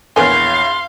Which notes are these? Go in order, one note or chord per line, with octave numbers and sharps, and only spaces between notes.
A#1 E2 A#4 B4 C#5 F5 G#5 C6